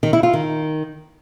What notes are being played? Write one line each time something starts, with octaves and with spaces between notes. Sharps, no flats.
D#3
E4
F4
D#3